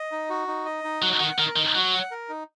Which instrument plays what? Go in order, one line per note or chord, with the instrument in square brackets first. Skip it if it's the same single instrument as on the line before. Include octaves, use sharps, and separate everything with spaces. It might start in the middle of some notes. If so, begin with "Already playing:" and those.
Already playing: [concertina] D#5
D#4
F#4
D#4
D#5
D#4
[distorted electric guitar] F#3 [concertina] F#4
[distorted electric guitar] D#3 [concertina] F#5
[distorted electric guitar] D#3 [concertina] A#4
[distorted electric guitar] D#3 [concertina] D#4
[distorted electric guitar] F#3 [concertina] F#4
[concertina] F#5
A#4
D#4